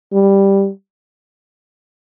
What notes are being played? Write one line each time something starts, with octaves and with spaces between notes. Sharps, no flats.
G3